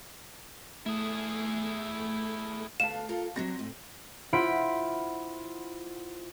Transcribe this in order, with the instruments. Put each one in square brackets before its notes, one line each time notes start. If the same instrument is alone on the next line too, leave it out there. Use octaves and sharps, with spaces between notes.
[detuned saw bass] A3 [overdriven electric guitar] E4 G#4
[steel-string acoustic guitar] D2 A3 B3 [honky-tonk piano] F5 A5 [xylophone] E7
[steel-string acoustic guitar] F4 A4 A#4
[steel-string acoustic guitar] F#3 G3 F#4 [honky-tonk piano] C4 A#6
[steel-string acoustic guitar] A2
[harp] E4 F4 C5 F#5 B5 D7